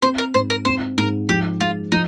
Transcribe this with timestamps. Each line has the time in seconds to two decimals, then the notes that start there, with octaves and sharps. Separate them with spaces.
0.02 C4 C5
0.18 A#4
0.34 G#2 C5
0.50 A#4
0.65 C4 C5
0.97 G#2 A#4
1.29 F3 G4
1.60 G#3 F4
1.92 F3 D#4